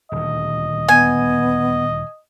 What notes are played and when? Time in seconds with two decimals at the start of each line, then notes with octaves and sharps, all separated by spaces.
0.12 D#1 D2 D#5
0.89 B3 G#5